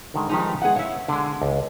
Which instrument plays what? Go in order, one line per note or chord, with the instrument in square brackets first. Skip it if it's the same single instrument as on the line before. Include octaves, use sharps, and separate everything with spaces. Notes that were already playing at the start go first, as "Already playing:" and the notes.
[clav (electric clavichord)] D3 D#3 G#3
[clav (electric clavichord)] D#3 F3 G#3 [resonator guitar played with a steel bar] G3 B3 D#4
[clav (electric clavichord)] G#3 B3 E4 [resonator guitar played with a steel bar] G#4 F#5
[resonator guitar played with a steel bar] E4 C#5 [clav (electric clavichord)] F5
[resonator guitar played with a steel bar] B2 G#3 [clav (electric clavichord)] D3
[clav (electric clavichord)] C#2